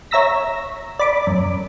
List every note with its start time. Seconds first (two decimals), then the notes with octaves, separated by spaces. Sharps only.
0.11 C#5 E5 A#5 E6 A#6 B6
0.99 D5 B5 D6
1.27 F#2